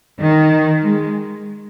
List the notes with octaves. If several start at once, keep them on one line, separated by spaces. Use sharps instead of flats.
D#3
G#3